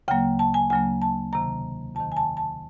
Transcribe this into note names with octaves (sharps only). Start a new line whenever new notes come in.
D2 C#3 F#3 A#3 G5
A5
G#5
D2 C#3 F#3 A#3 G#5
A5
E2 C3 D#3 A#5
E2 C3 D#3 A5
G#5
A5
A5